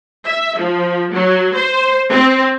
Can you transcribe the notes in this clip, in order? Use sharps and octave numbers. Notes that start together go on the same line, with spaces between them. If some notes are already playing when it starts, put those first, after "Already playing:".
E5
F3
F#3
C5
C4